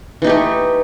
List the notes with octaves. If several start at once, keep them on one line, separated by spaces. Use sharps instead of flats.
E3 A3 D#4 G4